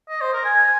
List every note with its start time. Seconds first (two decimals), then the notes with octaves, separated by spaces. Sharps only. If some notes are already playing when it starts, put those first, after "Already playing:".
0.09 D#5
0.21 C5
0.33 A#4
0.45 G#5